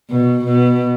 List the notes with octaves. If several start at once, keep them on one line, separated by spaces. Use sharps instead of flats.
B2
B2